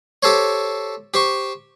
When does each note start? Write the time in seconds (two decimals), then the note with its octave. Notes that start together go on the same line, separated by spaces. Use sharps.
0.23 G4 A4 C5 C#5
1.14 G4 C5 C#6